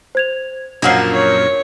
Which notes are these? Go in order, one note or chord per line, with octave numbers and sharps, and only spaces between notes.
C5 G#6 F7
F#2 A#2 F3 F#3 A#3 D4 F#5 C7
C#5